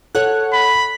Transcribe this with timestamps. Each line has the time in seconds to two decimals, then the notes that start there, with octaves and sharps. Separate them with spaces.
0.15 A4 C#5 F#5 F#6
0.53 B5